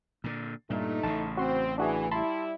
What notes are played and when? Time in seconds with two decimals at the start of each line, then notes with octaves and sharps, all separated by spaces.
0.24 A#2 D3
0.70 G2 A#2 A3 D#4
1.03 A1 C#3 A5
1.37 C4 F#4 C6
1.78 E3 D4 F#4 G#4
2.12 G3 E4 A5 B5 C6